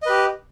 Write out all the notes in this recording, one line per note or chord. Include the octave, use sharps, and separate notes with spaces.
G4 B4 D#5